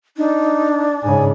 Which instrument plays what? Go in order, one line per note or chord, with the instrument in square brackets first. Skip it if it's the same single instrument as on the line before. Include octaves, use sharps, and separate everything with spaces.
[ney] D4 [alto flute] D#4
[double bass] G#2 C#3 [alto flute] G#5